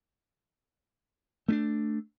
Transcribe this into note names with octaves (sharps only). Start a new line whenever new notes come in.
A3 C#4 D4